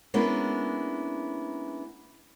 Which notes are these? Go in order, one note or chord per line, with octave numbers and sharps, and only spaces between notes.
G#3 A#3 B3 C#4 D4 E4